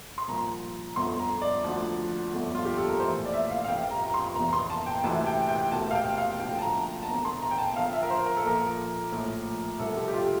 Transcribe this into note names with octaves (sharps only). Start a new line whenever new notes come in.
C6
C2 A#2 F3 A#5
G1 F2 D3 C6
A#5
D5
D2 D3 F3
G1 F2 D3 F3
F4
G4
A4
A#4
A#1 A2 E3 C5
D5
E5
F5
F5
F1 F2 C3 F3 G5
A#5
A#5
C6
F1 E2 E3 A#5
C6
A5
G5
D2 C3 E3 A5
G5
G5
E1 D2 C3 A5
F5
G5
F5
D2 D3 F3 G5
A5
A#5
A5
E1 E2 D3 A#5
C6
A#5
G5
A5
E2 D3 F3 F5
E5
A#4
C5
A#4
A4
A#1 A#2 F3 A#4
A#1 A2 F3
C2 C3 F3 A4
G4
G4
F4